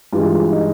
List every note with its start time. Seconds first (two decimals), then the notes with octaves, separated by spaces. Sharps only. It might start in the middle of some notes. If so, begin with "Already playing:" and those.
0.13 G2 E3 G#3 F4
0.52 D#4